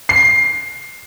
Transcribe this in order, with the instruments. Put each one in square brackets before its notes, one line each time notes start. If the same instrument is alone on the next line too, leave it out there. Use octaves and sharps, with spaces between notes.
[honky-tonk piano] C7